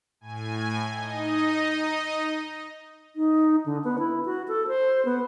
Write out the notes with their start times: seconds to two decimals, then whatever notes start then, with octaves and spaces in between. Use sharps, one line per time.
0.21 A2 G#5
0.93 D#4 D#5
3.15 D#4
3.66 D3
3.84 B3
3.99 E4
4.25 F#4
4.48 A4
4.67 C5
5.05 B3